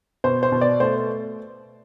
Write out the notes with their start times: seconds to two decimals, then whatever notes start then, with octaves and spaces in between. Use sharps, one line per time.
0.24 B2 C5
0.43 C5
0.52 B2
0.61 D5
0.80 A3 C5